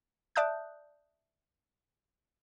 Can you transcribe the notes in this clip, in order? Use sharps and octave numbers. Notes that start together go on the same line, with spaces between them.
D5 E5 A5 D#6 F#6 G6